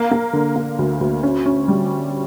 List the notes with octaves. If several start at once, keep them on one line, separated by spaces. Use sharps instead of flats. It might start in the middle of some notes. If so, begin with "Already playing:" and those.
Already playing: A#3
A#3
D3
A#3
D2
D2
C#4
C#4
G3